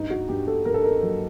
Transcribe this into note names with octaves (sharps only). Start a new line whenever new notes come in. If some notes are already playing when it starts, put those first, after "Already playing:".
Already playing: G2 D#4
F#4
G2 G4
A4
G2 A#4
A4
A#4
F#3